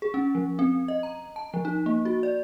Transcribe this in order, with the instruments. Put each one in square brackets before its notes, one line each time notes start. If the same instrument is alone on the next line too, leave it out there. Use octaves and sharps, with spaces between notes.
[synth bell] G#4
C#4
F3
C4
D#5
A#5
A5
F3
D#4
A#3
F#4
D5